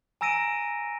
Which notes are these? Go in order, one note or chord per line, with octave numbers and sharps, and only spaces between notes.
G#5 A#5 E6 A#6 D7 D#7